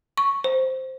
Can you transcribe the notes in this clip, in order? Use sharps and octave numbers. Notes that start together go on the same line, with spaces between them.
C#6
C5